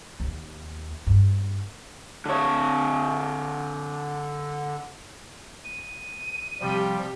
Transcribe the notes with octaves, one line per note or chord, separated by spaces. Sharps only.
D#2
G2
D3 C#5
D#7
C3 F3 G3 G4